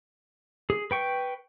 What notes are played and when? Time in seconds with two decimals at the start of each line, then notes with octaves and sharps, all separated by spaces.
0.70 G#4
0.91 B4 G5 C#6